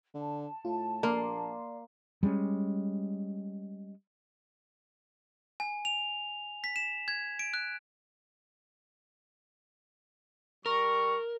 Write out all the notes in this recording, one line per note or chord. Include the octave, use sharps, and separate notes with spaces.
D3 A5
A2 F4
A#1 A#3 D5 C6
G3 G#3 A#3 C#4
G#5
F7
B6
E7
G#6
D7
F#6
G3 A#4 C#6